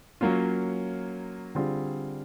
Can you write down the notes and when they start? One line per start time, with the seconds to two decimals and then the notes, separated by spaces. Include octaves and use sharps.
0.21 F#3 A#3 C#4 F4
1.55 D3 G3 C4 F4 G#4